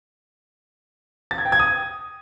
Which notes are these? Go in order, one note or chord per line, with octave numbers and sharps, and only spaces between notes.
A6
G#6
G5
G#6
D#6